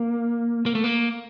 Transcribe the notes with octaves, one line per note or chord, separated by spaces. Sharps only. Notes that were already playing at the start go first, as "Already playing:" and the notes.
Already playing: A#3
A#3
A3
A#3